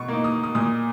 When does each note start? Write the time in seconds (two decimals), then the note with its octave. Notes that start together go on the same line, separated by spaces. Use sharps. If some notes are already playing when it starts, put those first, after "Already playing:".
Already playing: B2 C#6
0.08 A#3 D#4
0.24 D#6
0.44 D#6
0.55 A#2 D#6